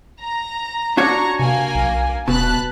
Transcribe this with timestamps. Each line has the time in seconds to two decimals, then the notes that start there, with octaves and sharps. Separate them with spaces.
0.22 A#5
0.97 D4 F#4 C#5 A#5 C#6
1.39 C3 A#3 G#5
1.75 B1
2.28 D#1 B2 A5 B5 F#6